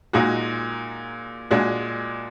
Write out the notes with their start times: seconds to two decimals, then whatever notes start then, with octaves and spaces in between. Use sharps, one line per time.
0.13 A#2 G#3 D#4 F#4
1.51 A#2 G#3 D4 F#4